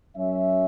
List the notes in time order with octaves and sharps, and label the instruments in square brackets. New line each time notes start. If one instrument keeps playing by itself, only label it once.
[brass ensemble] F#2 F#3 C#4 E5